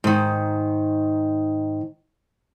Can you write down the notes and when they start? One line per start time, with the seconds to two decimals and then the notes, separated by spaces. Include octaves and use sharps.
0.04 G#2 D#3